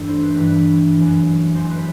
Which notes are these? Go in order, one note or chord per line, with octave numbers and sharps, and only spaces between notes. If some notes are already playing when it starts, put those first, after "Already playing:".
Already playing: G2 E3 A3 D4 E4
C5
B4
G2 E3 B4
F#2 E3
F#2 E3 C5
B4